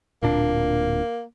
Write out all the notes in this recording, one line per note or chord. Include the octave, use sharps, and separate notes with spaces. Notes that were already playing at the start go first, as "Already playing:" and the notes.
D1 A#2 A#3 D4